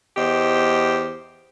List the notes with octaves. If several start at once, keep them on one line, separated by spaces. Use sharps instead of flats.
E2 G4 C5 D#5